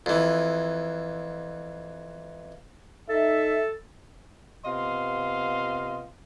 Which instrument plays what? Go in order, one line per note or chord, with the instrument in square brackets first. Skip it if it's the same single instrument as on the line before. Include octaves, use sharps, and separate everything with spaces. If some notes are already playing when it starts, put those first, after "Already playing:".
[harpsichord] F2 E3
[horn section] D#4 E5 [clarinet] A4
[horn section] C3 B3 F4 D#5 F5 C6